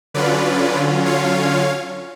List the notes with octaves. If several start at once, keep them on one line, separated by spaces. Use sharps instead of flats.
D3 F#3 C#4 F4 B4 D5
C#5 F5